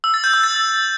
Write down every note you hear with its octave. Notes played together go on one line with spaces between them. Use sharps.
E6
A6
G6
E6
A6